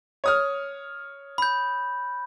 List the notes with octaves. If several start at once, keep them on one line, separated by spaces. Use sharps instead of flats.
C#5 D#6 F6
B5 G6